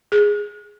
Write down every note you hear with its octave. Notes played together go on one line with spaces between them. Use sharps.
G#4